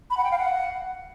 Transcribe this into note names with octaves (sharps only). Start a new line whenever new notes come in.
B5
F#5
G5
F5
F#5